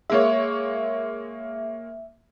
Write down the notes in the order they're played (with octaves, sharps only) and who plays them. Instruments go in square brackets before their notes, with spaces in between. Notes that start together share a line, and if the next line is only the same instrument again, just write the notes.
[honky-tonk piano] G#3 A#3 C#5 [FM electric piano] E5